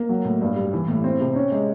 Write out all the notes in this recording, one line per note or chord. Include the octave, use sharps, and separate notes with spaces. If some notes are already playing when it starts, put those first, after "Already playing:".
Already playing: A#3
F#3
A2
G2
G3
E3
A2
C4
C3
C#4
G#3